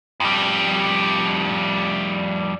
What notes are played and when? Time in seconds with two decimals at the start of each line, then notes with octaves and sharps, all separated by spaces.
0.20 F2 G3